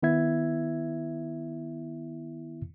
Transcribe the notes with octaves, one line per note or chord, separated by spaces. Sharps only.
D#3 B3 E4 E5 G#6